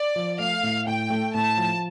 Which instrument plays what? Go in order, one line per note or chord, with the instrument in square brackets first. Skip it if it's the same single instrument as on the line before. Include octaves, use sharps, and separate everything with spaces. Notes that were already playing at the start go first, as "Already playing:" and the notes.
Already playing: [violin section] D5
[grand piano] F3
[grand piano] A3 [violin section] F5
[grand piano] A2
[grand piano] A2 [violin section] G5
[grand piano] A3
[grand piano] A2 [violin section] A5
[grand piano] F3